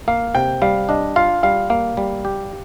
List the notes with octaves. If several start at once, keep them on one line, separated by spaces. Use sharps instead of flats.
A#3 F5
C3 G5
G3 F5
D4 D#5
F4 F5
G3 F5
A#3 F5
G3
G4